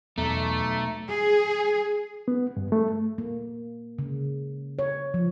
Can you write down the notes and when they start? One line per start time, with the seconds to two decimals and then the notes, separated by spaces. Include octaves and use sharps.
0.18 B1 E2 A3 D5 A#5
1.09 G#4
2.28 B3
2.57 G2
2.72 A3
3.18 A#3
3.99 C#3
4.79 C#5
5.14 F3